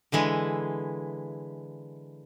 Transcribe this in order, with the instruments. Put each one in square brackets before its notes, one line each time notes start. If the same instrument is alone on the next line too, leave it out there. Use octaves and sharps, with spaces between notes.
[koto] D3 E3 G#3 E4